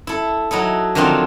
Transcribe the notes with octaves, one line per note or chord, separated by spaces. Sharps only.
E4 A4
F#3 D#4 E4 A4
D3 D#3 F3 F#3 C4 F4